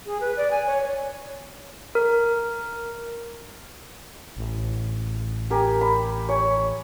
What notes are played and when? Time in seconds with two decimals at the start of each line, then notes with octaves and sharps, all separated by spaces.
0.06 G#4
0.21 B4
0.37 D5
0.51 G#5
0.67 C#5
1.95 A#4
4.37 A1
5.50 G4 A#4 G#5
5.81 B5
6.29 C#5 G#5